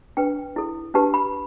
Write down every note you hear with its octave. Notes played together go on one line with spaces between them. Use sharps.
D4 B4 G5
E4 A4
D4 G4 B4 A5
B5